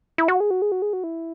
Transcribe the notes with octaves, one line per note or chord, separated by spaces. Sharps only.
E4
F#4
G#4
F#4
G#4
F#4
G#4
F#4
E4